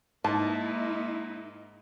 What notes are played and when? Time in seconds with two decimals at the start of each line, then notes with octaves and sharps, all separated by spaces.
0.24 G#2 A#3 D#4 E4 A5